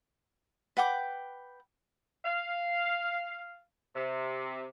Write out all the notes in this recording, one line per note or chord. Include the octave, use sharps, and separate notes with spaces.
B4 F#5 G5 D6
F5
C3